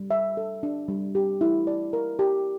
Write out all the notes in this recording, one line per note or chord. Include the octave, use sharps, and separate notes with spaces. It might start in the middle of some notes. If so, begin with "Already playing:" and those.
Already playing: G3
E5
A4
D4
G3
G4
E4
D5
A#4
G4